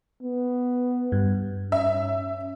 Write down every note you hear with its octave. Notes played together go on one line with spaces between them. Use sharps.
B3
G2
C#4 E5